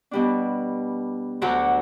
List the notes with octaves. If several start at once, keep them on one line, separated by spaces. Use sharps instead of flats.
B2 G3 D4
D2 D3 F#3